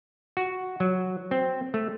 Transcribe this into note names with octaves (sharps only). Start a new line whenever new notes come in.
F#4
F#3
C4
A3